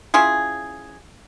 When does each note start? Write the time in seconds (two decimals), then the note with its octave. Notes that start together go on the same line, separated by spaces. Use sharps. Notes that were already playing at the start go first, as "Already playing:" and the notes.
0.14 C#4 E4 F4 G#4